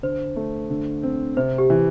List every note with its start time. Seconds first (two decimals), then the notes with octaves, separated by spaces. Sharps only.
0.03 D3 C5
0.36 A3
0.70 D3
1.03 C4
1.37 C3 C5
1.58 G4
1.70 E3